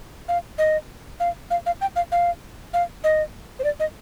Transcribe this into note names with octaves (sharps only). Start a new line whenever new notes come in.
F5
D#5
F5
F5
F5
G5
F5
F5
F5
D#5
C5
D5
D#5